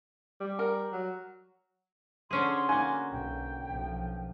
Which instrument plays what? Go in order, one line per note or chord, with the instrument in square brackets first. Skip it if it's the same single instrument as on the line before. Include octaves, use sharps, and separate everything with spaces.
[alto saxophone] G3
[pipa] A#4
[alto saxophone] F#3
[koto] D3 C#4 G#4 [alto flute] C6
[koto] A#3 F#4 [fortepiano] G#5
[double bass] B1 [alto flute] G5
[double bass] B1 F3